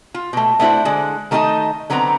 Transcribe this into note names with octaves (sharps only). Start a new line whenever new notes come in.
F4
B2 A3
A3 B3 D4 E4 F#4 C5
D3 G#3
D#3 A3 D#4 G4 D#5 A5
D3 F#3 B3 C4 A#5